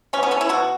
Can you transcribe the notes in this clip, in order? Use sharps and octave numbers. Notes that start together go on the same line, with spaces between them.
B2 C#4
B3
A3 C#4
E4
B2 F#4